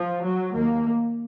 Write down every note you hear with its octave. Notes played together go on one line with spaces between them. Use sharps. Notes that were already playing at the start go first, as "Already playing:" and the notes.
Already playing: F3
F#3
D#2 A#3